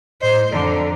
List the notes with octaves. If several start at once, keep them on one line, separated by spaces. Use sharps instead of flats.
A2 C5 D#5
F2 D3 A4 D5 A#5